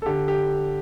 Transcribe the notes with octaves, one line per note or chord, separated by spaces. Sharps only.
A4
D3 G4
G4